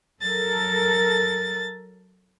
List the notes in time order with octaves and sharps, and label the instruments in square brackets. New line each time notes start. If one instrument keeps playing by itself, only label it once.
[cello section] F#3 A4 A#4 [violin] A6